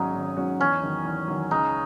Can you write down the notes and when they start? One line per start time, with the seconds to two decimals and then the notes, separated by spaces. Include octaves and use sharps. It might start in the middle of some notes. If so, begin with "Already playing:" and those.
Already playing: G#1 G#2 F#3 C#4 D#4 F#4
0.15 G#1
0.37 G#2 F#3 C#4 F#4
0.59 E2 C#4
0.83 D#3 F#3
1.05 E2
1.28 D#3 F#3
1.51 C#2 D#4